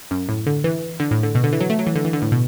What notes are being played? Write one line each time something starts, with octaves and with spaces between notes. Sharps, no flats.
F#2
A2
D3
E3
D3
A2
D3
B2
D3
E3
F#3
A3
F#3
E3
D3
E3
D3
A2
B2